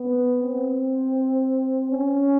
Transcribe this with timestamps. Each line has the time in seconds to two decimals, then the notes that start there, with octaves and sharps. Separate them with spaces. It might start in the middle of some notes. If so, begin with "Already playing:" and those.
Already playing: B3
0.43 C4
1.91 C#4